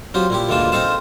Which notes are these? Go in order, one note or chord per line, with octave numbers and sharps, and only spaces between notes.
F#3 C4 F4 G4
A#2 E4 G4
D2 G#2 E3 A#3 F4 A5
C4 D#4 A4 C5 F5 A5